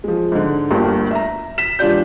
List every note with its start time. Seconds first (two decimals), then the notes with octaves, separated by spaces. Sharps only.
0.04 F3 G#3
0.32 G#2 D3
0.71 G1 D2 G2 A#3
1.11 E5 A#5
1.58 B6 E7
1.79 E1 D4 F4 G4 D5 G6